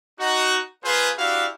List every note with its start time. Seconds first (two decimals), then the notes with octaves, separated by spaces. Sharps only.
0.20 D#4 F#4
0.84 A#3 F4 G#4 B4 C5
1.18 D4 E4 F#4 G4 F5